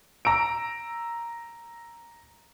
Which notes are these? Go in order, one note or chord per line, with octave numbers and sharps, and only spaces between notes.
A#5 E6 D7